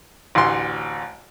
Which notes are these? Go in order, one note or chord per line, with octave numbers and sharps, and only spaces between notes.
A1 D2 C6